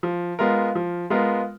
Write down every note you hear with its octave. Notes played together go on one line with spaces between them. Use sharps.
F3
G#3 B3 F4 A#4
F3
G#3 B3 F4 A#4